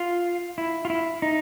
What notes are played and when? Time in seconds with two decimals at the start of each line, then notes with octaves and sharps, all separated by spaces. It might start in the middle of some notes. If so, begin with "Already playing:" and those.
Already playing: F4
0.58 E4
0.85 F4
0.90 E4
1.22 D#4